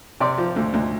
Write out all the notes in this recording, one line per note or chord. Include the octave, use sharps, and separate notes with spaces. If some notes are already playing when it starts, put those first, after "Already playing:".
C3 D5
F3
D2
D2